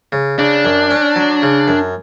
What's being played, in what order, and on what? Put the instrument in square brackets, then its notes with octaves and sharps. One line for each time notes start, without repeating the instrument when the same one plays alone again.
[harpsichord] C#3
[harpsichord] C#3 [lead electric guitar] D4
[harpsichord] F#2
C#4
F#3
C#3
F#2